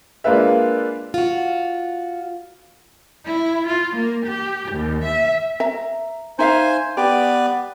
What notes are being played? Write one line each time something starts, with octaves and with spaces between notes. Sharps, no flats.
G#3 A#3 D4 F4 B4 E5
F4 F#4
E4
F4
A#3
G4
D#2
E5
E5 A#5
D#4 C5 E5 F5 G#5
B3 G4 B4 D5